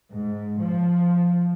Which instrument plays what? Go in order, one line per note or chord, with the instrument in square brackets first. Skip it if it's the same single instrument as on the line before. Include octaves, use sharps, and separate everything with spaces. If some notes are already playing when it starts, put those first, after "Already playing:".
[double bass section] G#2
F3